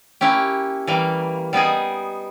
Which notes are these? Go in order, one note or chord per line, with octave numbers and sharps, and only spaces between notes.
A#3 C#4 E4 G4
E3 G3 A#3
G3 B3 D#4 G#4